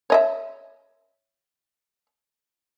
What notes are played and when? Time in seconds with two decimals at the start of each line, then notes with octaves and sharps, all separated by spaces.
0.10 C#5 D#5 E5